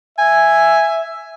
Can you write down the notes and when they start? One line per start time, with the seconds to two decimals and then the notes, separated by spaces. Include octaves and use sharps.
0.18 E5 G#5